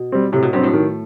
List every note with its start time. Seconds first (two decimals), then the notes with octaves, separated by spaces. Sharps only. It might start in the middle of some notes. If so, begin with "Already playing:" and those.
Already playing: B2
0.12 G3 C4
0.32 A2 C3
0.43 B2
0.53 G2 F#3 G3 C4
0.63 A2 A3
0.74 D#3